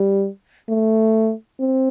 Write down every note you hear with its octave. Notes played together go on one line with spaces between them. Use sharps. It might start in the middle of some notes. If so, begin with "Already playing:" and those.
Already playing: G3
A3
C4